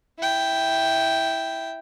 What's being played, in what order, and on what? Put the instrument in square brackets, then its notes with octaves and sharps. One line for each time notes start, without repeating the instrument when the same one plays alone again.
[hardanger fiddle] E4 G5